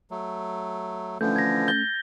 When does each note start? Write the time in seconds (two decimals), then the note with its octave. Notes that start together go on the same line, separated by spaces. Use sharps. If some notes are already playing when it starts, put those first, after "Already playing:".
0.11 F#3 A3
1.21 D3 E3 F3 A3 C#4 G6
1.36 G#6 A#6
1.68 G6 A6 G7